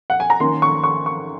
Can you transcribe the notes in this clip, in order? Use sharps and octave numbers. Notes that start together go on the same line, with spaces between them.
F#5
G#5
A#5
D#3 A#3 C#4 C6
C#6
C#6
C#6